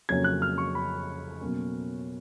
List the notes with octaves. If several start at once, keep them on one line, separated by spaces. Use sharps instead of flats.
F2 C#3 F#3 A#3 C#4 G#6
F#6
F6
C#6
B5
B2 F#3 A#3 C#4